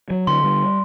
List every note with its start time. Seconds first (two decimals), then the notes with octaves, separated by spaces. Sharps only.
0.10 F#3
0.27 D3 C6
0.44 G3